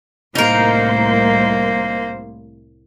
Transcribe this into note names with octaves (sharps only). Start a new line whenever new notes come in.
C2 A2 A#3 D#4 A#4 C5